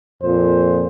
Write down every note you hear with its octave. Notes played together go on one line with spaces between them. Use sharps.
F2 A#2 C5